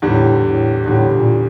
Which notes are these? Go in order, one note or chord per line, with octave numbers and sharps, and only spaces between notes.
E2 A2 D3 G3
A2
E2 A2 D3 G3
A#2